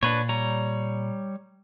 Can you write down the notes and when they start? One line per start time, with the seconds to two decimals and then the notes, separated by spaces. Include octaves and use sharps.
0.03 A#2 D4 B4 C#5
0.29 G3 C#5 A#5